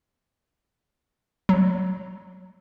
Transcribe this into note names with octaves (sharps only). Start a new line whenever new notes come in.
F#3